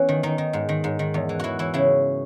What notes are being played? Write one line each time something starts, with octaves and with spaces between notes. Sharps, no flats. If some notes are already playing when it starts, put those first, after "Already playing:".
Already playing: E3 B3 C#4
D#3
D#3 D#4
D#3
G#2
D#3
G#2
D#3
E2
E3
E3 E4 F#4
E3 E4
C#3 E4